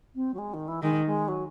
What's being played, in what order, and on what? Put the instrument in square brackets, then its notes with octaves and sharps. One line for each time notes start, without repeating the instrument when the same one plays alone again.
[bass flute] C4
F#3
G#3
D#3
E3
[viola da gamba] D#3 [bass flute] G#3
[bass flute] G#3
F#3